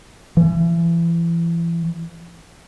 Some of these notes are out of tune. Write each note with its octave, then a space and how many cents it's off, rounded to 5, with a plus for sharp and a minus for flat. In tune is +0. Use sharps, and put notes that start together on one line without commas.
E3 +35